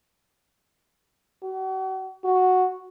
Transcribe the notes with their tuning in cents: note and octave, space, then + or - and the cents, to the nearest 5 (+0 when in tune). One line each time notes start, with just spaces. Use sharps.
F#4 +40
F#4 -5